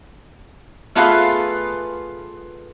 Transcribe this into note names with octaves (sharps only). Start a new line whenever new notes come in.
A3 B3 F4 G#4 B4 F5